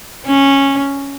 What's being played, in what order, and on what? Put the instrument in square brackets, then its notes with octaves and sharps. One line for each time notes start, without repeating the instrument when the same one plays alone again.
[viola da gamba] C#4